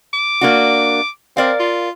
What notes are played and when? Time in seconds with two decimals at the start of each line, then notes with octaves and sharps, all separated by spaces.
0.13 D6
0.41 A#3 D4 F#4
1.37 C4 A#4 D5 F5
1.60 F4